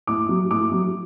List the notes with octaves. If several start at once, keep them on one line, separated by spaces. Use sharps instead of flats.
A2 D6
F#3
A2 D6
F#3